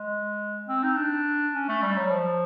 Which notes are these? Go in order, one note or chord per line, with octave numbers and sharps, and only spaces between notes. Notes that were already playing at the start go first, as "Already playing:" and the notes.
Already playing: G#3
C4
D#4
D4
C#4
A3
G3
F#3
F3